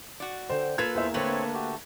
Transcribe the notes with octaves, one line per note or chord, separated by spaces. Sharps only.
F#4 D5
D3 C5 G5
A#3 F4 A4 B4 G#6
E2 C5 E5
D3 A3 C4 B4 C#5 F#7
F#4 G4